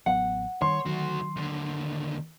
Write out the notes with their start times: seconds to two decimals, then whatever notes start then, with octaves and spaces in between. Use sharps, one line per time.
0.06 A1 F#3 B3 F#5
0.62 D#3 G3 C#5 C6
0.86 D2 D#3 F#3 F#4
1.36 D#2 D3